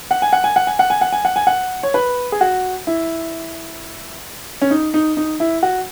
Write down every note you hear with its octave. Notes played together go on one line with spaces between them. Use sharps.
F#5
G#5
F#5
G#5
F#5
G#5
F#5
G#5
F#5
G#5
F#5
G#5
F#5
C#5
B4
G#4
F#4
E4
C#4
D#4
D#4
D#4
E4
F#4